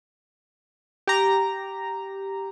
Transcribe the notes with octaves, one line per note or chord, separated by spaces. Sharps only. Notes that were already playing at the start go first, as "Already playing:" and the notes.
G4 A#5